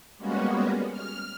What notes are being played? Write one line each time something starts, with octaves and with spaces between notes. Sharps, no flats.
G3 G#3 A#3 B3 C#4 F#4
F6